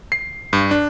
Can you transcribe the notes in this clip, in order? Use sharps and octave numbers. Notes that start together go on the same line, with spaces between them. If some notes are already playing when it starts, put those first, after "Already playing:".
C7
G2
D4